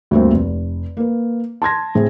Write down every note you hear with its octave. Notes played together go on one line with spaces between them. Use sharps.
D2 G2 A3 A#3 C4
F1
A#3 B4
A5 C6 G#6 A#6
A2 C4 G#4